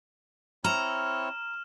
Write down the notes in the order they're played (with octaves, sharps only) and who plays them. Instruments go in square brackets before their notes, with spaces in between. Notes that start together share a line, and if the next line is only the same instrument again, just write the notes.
[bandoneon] C4 E4 C#5 [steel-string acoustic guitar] A#5 [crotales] F6 E7